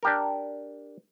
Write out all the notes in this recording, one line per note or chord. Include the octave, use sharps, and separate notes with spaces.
D4 G4 A#4